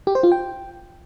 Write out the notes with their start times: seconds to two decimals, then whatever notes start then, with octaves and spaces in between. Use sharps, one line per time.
0.07 G4
0.15 C5
0.23 F4
0.32 G5